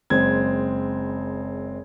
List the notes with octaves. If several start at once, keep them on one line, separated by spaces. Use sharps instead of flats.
F#1 G#3 C4 G#6